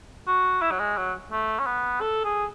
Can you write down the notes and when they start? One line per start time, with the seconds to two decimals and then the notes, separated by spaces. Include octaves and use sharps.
0.27 F#4
0.62 E4
0.71 F#3
0.79 G#3
0.97 F#3
1.32 A3
1.59 C#4
1.66 B3
2.01 A4
2.24 G#4